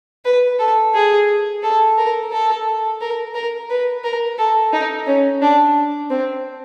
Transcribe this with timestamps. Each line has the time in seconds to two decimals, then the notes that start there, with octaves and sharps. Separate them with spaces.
0.25 B4
0.59 A4
0.95 G#4
1.63 A4
1.98 A#4
2.32 A4
3.01 A#4
3.35 A#4
3.70 B4
4.04 A#4
4.39 A4
4.73 D#4
5.07 C#4
5.42 D4
6.10 C4